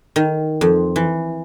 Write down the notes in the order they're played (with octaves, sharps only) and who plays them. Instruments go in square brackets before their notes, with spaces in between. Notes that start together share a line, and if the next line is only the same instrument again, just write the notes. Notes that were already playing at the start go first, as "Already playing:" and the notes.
[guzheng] D#3
F2
E3